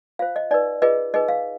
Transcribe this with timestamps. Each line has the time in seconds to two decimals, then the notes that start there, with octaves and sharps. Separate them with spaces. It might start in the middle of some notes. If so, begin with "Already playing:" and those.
0.19 F4 C5 F5
0.36 D#5
0.51 D#4 B4 D5
0.82 F4 G#4 B4 D#5
1.14 D#4 G#4 B4 D#5
1.28 F5